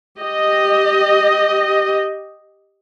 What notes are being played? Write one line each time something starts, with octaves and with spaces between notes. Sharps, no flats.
G4 D#5